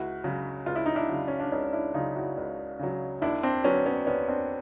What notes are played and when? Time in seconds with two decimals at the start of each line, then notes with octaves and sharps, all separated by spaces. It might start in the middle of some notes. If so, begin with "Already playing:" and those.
Already playing: C#2 E4 F#4
0.24 C#3 F#3
0.66 C#2 F4
0.76 E4
0.86 D#4
0.95 D4 E4
1.09 C#3 F#3
1.28 C#4
1.40 D4
1.52 C#2 C#4 D#4
1.73 D4 E4
1.94 C#3 F#3 D#4 F4
2.16 E4 F#4
2.37 C#2
2.79 C#3 F#3
3.21 D#2 D4 E4
3.43 C4 D4
3.64 D3 F#3 B3 C#4
3.86 B3 C#4
4.07 D#2 B3 C#4
4.28 C4 D4